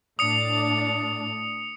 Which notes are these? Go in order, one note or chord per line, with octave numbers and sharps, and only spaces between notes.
A2 D4 D#6 C#7